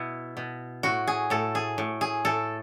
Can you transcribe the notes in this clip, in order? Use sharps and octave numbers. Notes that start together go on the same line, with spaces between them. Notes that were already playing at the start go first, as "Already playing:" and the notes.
Already playing: B2 E4
B2
A2 F#4
G#4
A2 A4
G#4
A2
G#4
A2 A4